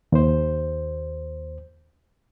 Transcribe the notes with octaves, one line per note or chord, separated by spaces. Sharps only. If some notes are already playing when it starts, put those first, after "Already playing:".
D#2 C5